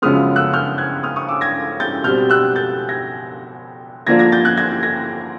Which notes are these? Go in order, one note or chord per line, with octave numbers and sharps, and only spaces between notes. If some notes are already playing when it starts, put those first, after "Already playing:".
F#2 C#3 F3 G#3 B3 D#6 F6
E6 F#6
F6 G6
F#6 G#6
D#6 F6
C#6 D#6
D6 E6
G#6 A#6
G6 A6
B2 G3 C4 F6 G6
E6 F#6
G6 A6
G#6 A#6
D3 F3 A#3 D4 F4 G#6 A#6
G#6 A#6
G6 A6
F#6 G#6
G#6 A#6
G#6 A#6